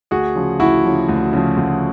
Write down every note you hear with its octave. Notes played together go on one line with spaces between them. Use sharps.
D2 F#4 G#4
C#3 F3
D2 E4 F#4
C#3 F3
D2
C#3 F3
D2